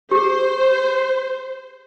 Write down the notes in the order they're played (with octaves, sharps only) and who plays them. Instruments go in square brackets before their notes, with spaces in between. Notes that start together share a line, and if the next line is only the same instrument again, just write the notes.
[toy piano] G4 G#4 [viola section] C5